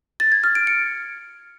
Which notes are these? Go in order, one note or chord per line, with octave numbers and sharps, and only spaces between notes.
A6
G#6
F6
D7
C#7